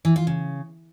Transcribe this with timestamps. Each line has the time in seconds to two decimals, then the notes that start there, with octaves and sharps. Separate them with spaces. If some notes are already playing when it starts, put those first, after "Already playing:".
0.05 E3
0.16 F4
0.27 C#3